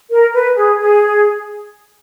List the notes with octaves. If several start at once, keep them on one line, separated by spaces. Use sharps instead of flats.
A#4
B4
G#4
G#4